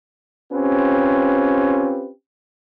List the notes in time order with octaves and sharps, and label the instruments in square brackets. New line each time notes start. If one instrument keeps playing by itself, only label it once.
[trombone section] C4 C#4 F4 G4 B4